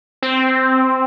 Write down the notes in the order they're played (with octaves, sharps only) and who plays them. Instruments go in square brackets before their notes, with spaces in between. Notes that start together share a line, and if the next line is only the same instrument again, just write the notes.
[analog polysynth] C4